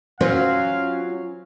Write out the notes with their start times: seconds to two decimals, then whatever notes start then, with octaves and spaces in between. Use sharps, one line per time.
0.21 F#3 C#4 F4 C5 F5